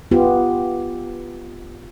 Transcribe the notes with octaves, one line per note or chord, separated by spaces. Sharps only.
B3 F4 G4